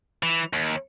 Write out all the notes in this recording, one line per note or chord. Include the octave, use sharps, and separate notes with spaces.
E3
D#2